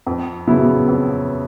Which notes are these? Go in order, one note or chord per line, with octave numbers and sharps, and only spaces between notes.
F2
C#3 F#3 B3 E4
F2